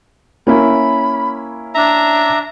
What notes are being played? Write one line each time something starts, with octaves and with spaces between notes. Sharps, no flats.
A#3 C#4 E4 B5
D4 E5 A#5